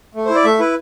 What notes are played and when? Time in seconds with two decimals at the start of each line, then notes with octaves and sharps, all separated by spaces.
0.15 A3
0.25 E4 C5
0.35 D5
0.44 A3 E5
0.59 E4 B4